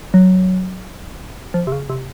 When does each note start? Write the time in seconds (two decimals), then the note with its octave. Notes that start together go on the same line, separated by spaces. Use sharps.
0.14 F#3
1.54 F3
1.67 C3
1.72 C#3
1.89 C3